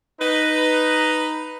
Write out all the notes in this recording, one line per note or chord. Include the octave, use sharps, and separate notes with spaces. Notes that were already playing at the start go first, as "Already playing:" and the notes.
D#4 B4